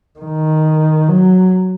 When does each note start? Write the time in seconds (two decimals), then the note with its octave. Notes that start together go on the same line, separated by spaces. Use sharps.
0.19 D#3
1.08 F#3